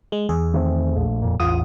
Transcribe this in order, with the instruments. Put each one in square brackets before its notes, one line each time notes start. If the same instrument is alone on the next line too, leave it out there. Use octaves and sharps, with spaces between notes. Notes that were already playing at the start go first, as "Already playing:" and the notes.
[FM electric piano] G#3
E2 G#4
[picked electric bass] D#3 A3 C4
A#1 A3
E1 F2 A#2
[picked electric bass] A1 E2 [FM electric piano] F4 D#6